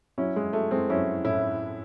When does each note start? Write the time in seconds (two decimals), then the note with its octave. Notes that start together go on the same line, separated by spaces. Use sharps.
0.18 F#3 C#4 E4
0.36 G#3
0.53 F#3 A3
0.71 G#3 C4
0.89 F#3 C#4 E4
1.24 A2 C#4 E4